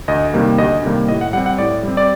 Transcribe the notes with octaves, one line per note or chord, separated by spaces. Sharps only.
D2 D#5
C3 D#3 G3 A#3
D2 D#5
C3 D#3 G3 A#3
A2 D#5
F#5
G3 C4 F#5
F#5
A2 D5
G3 C4
D5